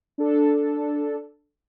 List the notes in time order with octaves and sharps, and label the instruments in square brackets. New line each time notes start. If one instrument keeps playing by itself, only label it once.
[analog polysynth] D4 A4